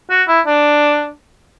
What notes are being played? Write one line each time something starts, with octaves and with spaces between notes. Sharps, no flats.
F#4
E4
D4